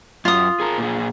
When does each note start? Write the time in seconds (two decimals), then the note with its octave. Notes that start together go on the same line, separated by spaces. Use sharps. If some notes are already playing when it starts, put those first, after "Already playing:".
0.25 F#2 F4 D#6
0.60 G#4 A#4
0.78 A#2 G#4